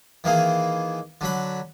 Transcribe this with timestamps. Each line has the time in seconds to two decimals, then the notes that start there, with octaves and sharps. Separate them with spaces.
0.24 D#3 E3 A#3 G#4
1.21 D3 F#3 B5